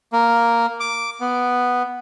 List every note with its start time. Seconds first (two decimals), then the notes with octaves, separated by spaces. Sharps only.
0.13 A#3
0.80 D6
1.21 B3